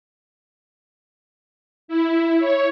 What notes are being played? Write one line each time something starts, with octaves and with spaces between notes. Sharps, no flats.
E4
C#5